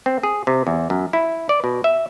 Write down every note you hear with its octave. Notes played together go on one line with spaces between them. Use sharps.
C4
G#4
C3
E2
F#2
E4
D5
B2
E5